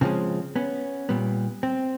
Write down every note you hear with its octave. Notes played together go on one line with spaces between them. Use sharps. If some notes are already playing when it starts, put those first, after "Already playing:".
C#3 F3 G#3 C4
B3 C#4
A#2 G3 B3
C4